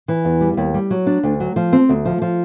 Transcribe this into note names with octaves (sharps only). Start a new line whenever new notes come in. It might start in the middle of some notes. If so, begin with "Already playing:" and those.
E3
E2
G3
D#2
G3
F#3
D4
D2
F#3
F3
C4
D2
F3
F3